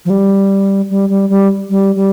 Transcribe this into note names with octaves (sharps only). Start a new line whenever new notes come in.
F3
G3
G3
G3
G3
G3
G3